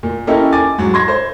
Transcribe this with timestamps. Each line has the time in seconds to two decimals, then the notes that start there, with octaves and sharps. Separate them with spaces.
0.03 A#2
0.27 A#3 C#4 D#4 E4 G4 A4
0.52 G#5 D6 A6
0.78 G#2 F#3
0.94 C6 G#6 A#6
1.08 C5